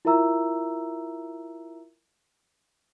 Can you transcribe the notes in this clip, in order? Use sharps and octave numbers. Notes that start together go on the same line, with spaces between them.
E4 F4 A#4 E5 A#5 E6